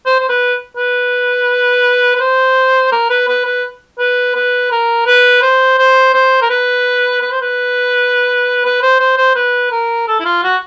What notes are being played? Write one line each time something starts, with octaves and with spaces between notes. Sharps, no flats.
C5
C5
B4
B4
B4
C5
A#4
B4
B4
B4
B4
B4
A#4
B4
C5
C5
C5
A#4
B4
B4
C5
B4
B4
C5
C5
C5
B4
A#4
A4
E4
F4
F#4